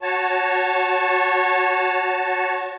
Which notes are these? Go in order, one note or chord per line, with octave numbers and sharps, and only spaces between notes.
F#4 C#5 A5